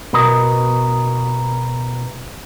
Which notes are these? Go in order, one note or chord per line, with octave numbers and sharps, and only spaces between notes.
B2 B3 A#4 D#5